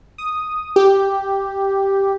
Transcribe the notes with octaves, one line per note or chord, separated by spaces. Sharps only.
D#6
G4